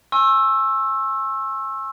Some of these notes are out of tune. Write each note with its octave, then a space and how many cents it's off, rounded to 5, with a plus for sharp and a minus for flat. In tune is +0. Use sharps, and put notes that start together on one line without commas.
G#5 +0 C#6 -45 E6 +5